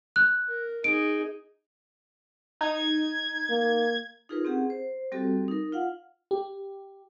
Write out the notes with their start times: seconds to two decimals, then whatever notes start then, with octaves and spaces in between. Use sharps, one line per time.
0.16 F#6
0.48 A#4
0.84 D#4 G#4 D7
2.61 D#4 G#6
3.50 A#3
4.29 D#4 F4 G#4 A#4 B4
4.45 C4 C#4 G4 G#4 F#5
4.70 C5
5.12 G3 C4 F#4 G4 A4
5.48 D#4 A#4
5.72 F4 F5 F#5
6.31 G4